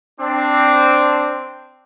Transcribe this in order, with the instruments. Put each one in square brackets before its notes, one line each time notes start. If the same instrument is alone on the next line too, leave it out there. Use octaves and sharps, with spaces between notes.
[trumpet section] C4 D4